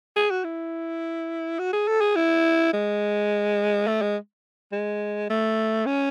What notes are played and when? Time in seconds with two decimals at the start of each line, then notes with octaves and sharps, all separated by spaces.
0.16 G#4
0.31 F#4
0.44 E4
1.59 F#4
1.73 G#4
1.88 A4
2.01 G#4
2.16 E4
2.73 G#3
3.87 A3
4.02 G#3
4.72 G#3
5.30 A3
5.86 C#4